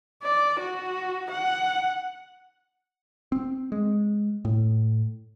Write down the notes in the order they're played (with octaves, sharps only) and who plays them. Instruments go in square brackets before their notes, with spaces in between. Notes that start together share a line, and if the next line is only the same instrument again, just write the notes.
[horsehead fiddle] D5
F#4
F#5
[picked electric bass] C4
G#3
A2